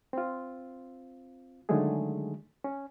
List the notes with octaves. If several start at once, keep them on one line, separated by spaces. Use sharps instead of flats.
C4 F4
D3 D#3 F#3 G#3 A3 G#4
C#4